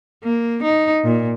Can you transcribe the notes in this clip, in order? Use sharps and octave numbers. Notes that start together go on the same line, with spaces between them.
A#3
D#4
A#2